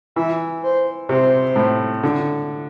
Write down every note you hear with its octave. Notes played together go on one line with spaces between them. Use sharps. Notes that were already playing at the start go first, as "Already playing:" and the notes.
E3 E5
C5
C3 C5
A2
D3